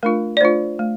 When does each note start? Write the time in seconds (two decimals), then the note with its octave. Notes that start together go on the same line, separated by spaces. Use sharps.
0.03 A3 D4 F4 A#4
0.37 D5
0.41 A3 D4 F4 C5
0.79 A3